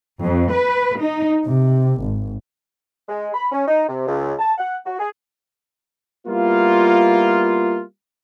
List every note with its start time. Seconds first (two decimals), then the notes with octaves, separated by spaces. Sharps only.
0.22 F2
0.53 B4
1.02 D#4
1.44 C3
2.00 G#1
3.09 G#3
3.34 B5
3.52 C#4
3.68 D#4
3.89 C3
4.07 C#2
4.39 A5
4.58 F#5
4.85 F#4
4.99 G#4
6.26 G3 A#3 B3 E4 F4